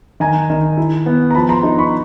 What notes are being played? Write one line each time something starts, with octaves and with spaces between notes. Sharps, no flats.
D#3 G#5 A#5
D#3
E4
B3
A#5
F3 A5 B5
A#5 C6
D#4
B5 C#6